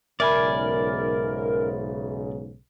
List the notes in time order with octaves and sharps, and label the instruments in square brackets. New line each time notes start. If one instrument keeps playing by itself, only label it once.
[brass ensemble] B1 G#2 C#3 [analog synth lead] A#4 [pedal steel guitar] D5 G#5 [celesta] E5 B5